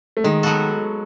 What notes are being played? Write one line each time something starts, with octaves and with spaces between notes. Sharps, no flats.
A3
D#3 G#3
F#3 B3 F#4 A4